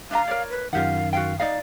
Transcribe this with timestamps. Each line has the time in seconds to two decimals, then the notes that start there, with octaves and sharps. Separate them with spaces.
0.11 D4 E5 F5 A#5
0.28 A#4 C#5 D5
0.50 B4
0.73 F#2 D#3 F4 G4 F5 F#5
1.13 F#4 F5 G5
1.40 D#4 D5 D#5 F5